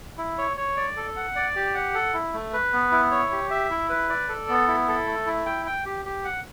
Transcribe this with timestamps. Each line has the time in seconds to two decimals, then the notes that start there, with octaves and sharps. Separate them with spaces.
0.18 E4
0.38 C#5
0.57 C#5
0.77 D5
0.97 A4
1.16 F#5
1.36 D5
1.56 G4
1.74 F#5
1.94 A4
2.14 E4
2.34 A3
2.53 B4
2.73 B3
2.92 E4
3.11 C#5
3.31 G4
3.51 E5
3.70 E4
3.90 B4
4.09 D5
4.29 A4
4.49 B3
4.68 E4
4.88 A4
5.07 A3
5.26 E4
5.46 G5
5.66 G5
5.86 G4
6.05 G4
6.25 F#5